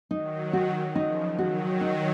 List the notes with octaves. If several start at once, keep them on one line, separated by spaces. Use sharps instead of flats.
D#3 F#3 D#4
F#4
C#3 F3 D#4
D#3 F#3 F#4
D#4